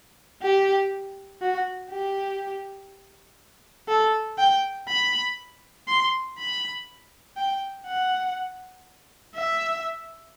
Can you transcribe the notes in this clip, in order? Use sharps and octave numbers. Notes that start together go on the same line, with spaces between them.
G4
F#4
G4
A4
G5
B5
C6
B5
G5
F#5
E5